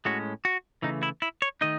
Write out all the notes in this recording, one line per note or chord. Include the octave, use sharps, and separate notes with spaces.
A2 G#3 C#4 F#4
F#4
C#3 E3 A3 D#4
E4
E4
C#5
D#3 A3 D#4 D#5